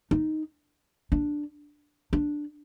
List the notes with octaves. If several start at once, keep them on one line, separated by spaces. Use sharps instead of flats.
D#4
D4
D4